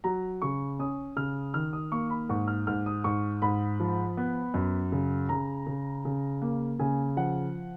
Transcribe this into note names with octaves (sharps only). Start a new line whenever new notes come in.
F#3 A#5
C#3 C#6
C#4 D#6
C#3 F6
D#3 F6
D#6
A#3 C#6
B5
G#2 C#6
F6
G#2 F6
D#6
G#2 C#6
G#2 B5
F3
B3
F#2
C#3
C#3 A#5
C#3
C#3
A#3
C#3 G#5
F3 F#5